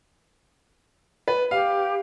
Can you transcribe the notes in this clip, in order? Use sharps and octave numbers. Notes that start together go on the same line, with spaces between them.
B4
G4 F5